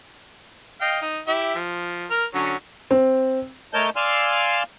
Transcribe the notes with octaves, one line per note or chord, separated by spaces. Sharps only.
D#5 F5 G5
D#4
E4 G4 E5
F3
A#4 F6
D3 F#3 C#4
C4
A3 A#4 C#5 D#5 A5 G6
D5 F5 G#5 C6 E6 F6